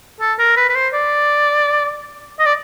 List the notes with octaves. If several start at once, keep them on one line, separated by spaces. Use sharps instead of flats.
A4
A#4
B4
B4
C5
D5
D#5
D5